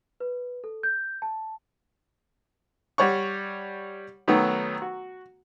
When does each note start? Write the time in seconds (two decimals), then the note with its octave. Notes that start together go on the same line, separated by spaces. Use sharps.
0.20 B4
0.64 A4
0.83 G6
1.22 A5
2.98 G3 C#5 F#5 C#6
4.28 D#3 F#3 A3 B3
4.82 F#4